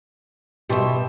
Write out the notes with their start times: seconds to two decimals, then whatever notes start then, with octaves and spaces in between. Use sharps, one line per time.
0.69 B2 G4 E5 C6 C#6